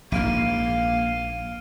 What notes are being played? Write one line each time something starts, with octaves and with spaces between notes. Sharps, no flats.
A#1 G#2 A#3 F5 F6 D7 D#7